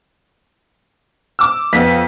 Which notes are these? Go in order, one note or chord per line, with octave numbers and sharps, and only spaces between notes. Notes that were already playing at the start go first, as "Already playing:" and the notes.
D6 E6
F2 B3 B6